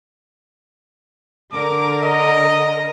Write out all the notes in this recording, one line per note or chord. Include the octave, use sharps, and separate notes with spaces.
D3 A#4 D6
D#5